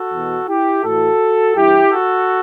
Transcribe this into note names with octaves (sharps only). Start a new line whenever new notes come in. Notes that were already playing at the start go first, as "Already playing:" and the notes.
Already playing: F#4 A4
E2 B2
E4 G4
A2 E3 F#4 A4
G2 E3 E4 G4
F#4 A4